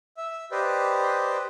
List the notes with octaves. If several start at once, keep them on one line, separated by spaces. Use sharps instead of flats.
E5
G4 B4 C5 D5 D#5